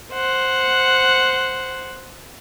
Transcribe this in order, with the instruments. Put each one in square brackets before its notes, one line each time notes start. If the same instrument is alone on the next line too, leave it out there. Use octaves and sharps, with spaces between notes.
[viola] C5 F#5